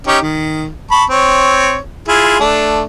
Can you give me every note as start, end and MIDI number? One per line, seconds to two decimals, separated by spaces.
0.07 0.19 61
0.07 0.19 63
0.07 0.19 67
0.22 0.67 51
0.91 1.04 81
0.91 1.04 83
0.91 1.04 85
1.10 1.77 60
1.10 1.77 73
2.08 2.39 64
2.08 2.39 65
2.08 2.39 68
2.40 2.82 57
2.40 2.82 62